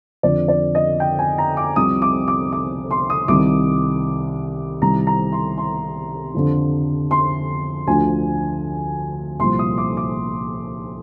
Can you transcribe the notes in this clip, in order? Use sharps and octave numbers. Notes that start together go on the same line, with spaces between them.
F2 D3 F3 D5
D5
D#5
G5
G#5
A#5
D6
C2 C3 F3 D#6
D6
D6
D6
C6
D#6
C2 C3 D#3 D6
C2 C3 D#3 A#5
A#5
C6
C6
F2 D3 F3
C6
D2 D3 F3 G#5
C2 A#2 F3 C6
D#6
D6
D6